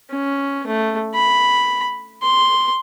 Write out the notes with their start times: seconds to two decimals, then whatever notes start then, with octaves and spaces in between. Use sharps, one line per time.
0.11 C#4
0.67 A3
1.15 B5
2.22 C6